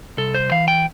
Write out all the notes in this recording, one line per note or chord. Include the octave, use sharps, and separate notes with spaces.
C2 A4
C5
E3 F5
G5